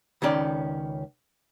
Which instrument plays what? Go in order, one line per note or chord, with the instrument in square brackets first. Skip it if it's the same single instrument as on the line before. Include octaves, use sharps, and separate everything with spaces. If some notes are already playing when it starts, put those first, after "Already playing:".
[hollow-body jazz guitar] C#2 D#3 C#4 D5